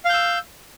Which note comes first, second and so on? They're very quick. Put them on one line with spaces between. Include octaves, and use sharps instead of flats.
F5 G6 E6